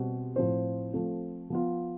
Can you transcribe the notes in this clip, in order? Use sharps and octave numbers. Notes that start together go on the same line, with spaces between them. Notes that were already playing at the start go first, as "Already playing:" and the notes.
Already playing: B2 G3 C4
A2 F3 C4 F4 C5
F3 A3 C4 F4
F3 B3 F4